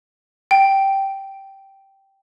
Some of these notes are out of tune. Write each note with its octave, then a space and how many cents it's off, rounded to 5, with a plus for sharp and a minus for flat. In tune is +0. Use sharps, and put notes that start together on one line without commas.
G5 -10